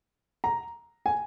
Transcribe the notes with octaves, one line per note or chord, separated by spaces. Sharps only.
A#5
G#5